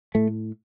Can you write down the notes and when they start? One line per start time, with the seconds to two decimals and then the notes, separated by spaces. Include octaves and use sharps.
0.15 A2 A3